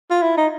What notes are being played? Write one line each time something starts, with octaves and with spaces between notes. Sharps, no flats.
F4
E4
D#4